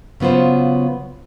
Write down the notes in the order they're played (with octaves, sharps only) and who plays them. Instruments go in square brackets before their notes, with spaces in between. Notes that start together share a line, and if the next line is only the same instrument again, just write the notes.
[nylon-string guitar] C#3 F#3 B3 F4 C5